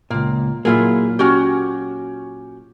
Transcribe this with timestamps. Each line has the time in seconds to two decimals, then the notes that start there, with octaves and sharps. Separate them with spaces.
0.10 C#2 A#2 A#3
0.65 A#2 F#3 A#3 E4 F4 G#4
1.19 C#4 F#4 G4